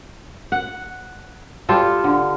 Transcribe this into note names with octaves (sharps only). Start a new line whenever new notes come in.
F#5
G3 F4 A4
D3